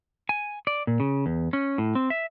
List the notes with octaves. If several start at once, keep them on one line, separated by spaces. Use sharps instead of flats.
G#5
D5
A#2
C#3
E2
C#4
A2
C4
E5